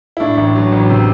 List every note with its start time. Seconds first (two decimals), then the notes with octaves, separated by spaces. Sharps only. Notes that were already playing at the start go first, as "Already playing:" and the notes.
0.17 E4
0.20 A2 D4
0.37 A1
0.55 F#3
0.72 A1
0.90 C3